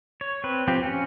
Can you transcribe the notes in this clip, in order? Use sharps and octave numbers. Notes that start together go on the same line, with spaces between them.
C#5
C4 B4
F3 C4 G4
C#4